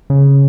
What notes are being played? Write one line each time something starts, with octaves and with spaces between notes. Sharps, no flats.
C#3